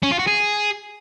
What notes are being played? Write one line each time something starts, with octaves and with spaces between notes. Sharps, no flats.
C#4
F4
F#4
G#4